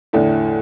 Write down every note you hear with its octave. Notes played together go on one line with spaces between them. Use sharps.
E2 A2 D3 A3 D4